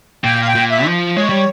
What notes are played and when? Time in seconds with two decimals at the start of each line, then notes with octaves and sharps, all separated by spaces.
0.24 A#2 G5
0.41 F5
0.48 G5
0.55 A#2
0.71 E5
0.86 F3
1.17 G#3 C#5
1.29 G3